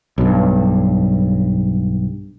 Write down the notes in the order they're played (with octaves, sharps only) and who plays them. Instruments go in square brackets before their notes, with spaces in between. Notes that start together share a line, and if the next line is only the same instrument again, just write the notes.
[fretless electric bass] B1 G2